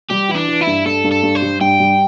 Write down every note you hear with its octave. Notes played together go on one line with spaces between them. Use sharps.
G3 G4
E3 E4
D4
E3
E4
G2
G2 A4
G2
A4
G2
C5
G3
G2 G5
G3